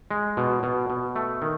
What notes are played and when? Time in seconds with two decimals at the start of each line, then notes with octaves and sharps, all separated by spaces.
0.10 G#3
0.37 B2
0.63 B2
0.90 B2
1.16 A3
1.42 D#3